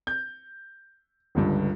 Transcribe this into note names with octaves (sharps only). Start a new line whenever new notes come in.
G6
G1 C#2 G2